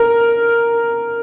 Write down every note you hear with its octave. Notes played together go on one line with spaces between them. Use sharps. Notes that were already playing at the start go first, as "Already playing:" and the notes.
Already playing: A#4